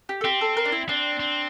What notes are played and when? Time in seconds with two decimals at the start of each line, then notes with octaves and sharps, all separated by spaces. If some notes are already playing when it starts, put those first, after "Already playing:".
0.09 G4
0.21 A4
0.24 C4 G4
0.41 A4
0.57 A#4
0.65 D4
0.72 E4
0.89 C4 D4
1.20 C4